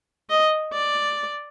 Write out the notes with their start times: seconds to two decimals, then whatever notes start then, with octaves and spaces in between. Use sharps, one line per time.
0.30 D#5
0.74 D5